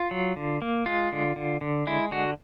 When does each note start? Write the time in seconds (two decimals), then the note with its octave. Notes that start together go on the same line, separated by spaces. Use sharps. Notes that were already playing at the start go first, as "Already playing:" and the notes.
Already playing: F4
0.11 F#3
0.36 D3
0.62 A#3
0.86 G#3 F4
1.12 D3
1.36 D3
1.61 D3
1.87 G#3 E4
2.11 D3 F#4